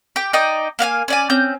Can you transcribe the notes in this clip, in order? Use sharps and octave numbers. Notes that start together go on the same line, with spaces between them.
G4 G5
D#4 D5 D#5 G5
A#3 F5 F#5 G#5
C#4 D5 G#5
C4 C#4 G6